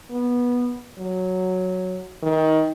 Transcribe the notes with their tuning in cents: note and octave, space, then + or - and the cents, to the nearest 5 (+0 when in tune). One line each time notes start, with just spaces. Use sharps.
B3 -15
F#3 -5
D#3 +20